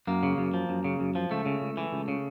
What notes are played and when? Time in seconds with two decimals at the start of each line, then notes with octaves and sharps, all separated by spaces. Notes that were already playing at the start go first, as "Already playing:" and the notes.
0.07 F#2 A#3
0.23 C#3
0.38 F#2
0.54 F3
0.69 F#2
0.84 C#3
1.00 F#2
1.15 F3
1.31 C#2 A3
1.46 C#3
1.62 C#2
1.77 E3
1.93 C#2
2.08 C#3